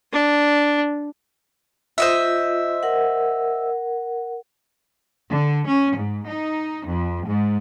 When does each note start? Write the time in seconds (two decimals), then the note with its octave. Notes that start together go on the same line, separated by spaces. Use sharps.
0.13 D4
1.98 F4 C5 D#5 E5
2.83 A#4 F#5
5.29 D3
5.67 C#4
5.97 G#2
6.28 D#4
6.87 F2
7.27 G#2